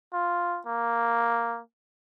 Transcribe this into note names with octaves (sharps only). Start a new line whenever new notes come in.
F4
A#3